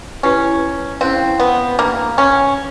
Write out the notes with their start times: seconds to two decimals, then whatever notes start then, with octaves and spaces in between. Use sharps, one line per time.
0.23 C#4 E4 G4 B4
1.01 C4 C#4 E4 G#4 C5 F5
1.40 B3
1.79 A#3 D4 G4 B4 E5 A5
2.18 C#4